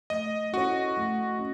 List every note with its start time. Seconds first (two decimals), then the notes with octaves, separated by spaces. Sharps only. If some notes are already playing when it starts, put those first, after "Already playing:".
0.10 A3 D#5
0.52 C#4 E4 F#4 A4 C#5
0.97 A3
1.39 C#4